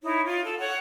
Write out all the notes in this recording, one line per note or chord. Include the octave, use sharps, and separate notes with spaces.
D#4 E4 C#5
F4
A4
C#5 F#5